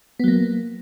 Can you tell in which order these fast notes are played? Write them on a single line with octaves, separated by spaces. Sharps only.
B3 F#3 A#3